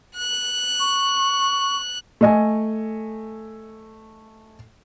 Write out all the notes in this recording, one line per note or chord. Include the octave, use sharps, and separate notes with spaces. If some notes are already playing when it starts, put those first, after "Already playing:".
F#6
C#6
A3 D#5 G#5